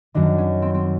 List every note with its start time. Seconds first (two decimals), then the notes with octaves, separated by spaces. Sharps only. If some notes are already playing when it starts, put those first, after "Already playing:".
0.14 F#2 D#3 D4
0.38 C#4
0.62 C4
0.74 C4